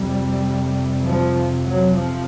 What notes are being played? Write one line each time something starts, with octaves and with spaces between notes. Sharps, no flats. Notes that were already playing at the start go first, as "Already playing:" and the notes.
Already playing: F2 C3 G3
F3
F#3
F3